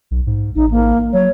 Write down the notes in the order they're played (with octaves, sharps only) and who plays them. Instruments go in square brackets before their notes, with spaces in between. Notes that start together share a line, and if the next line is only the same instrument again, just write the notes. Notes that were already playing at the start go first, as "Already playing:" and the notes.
[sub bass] B1
G#2
[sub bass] A1 [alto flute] D#4
[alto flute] A#3
[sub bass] F#3 [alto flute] C#5